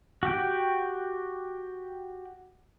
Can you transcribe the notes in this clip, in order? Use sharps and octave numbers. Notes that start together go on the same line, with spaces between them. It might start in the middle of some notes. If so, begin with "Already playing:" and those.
F#4 G4 G5